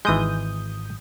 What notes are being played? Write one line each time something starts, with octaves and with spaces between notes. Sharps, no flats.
G#1 E3 G#3 D#6 G6